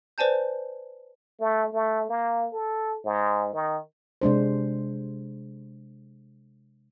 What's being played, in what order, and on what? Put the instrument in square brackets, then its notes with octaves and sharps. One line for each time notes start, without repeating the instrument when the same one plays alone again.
[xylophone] B4 C5 D5 G#5 A5 G6
[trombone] A3
A3
A#3
A4
G#2
D#3
[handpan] C3 G#3 D4 C5